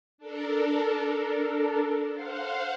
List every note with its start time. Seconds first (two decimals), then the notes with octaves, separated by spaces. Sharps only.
0.18 D4 A4 A#4
2.13 C5 F5 F#5